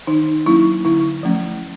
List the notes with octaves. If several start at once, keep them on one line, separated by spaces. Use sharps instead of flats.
D#3 D#4
F#3 A#3 C#4 E4
D3 E4
F3 A3 C#4